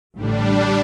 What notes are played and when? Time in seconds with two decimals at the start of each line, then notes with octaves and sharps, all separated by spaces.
0.16 A1 A2 D3 G3 D4